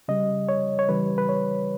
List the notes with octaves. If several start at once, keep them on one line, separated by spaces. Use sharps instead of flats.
C#3 G3 D#5
C#5
C#5
C#3 E3 G3 B4
B4
C#5